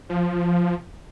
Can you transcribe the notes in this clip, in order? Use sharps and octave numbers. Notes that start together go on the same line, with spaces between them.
F3